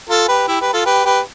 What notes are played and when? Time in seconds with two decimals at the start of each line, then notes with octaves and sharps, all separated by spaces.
0.10 F4 A4
0.28 G4 B4
0.48 E4 G4
0.61 G4 B4
0.73 F4 A4
0.86 G4 B4
1.05 G4 B4